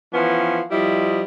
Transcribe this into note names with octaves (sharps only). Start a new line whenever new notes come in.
E3 F3 B3 C#4
F3 G3 E4 D#5